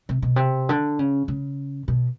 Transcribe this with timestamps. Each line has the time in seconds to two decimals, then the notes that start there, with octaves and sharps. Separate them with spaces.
0.09 C3
0.22 B2
0.36 C3
0.69 D3
0.99 C#3
1.28 C#3
1.88 B2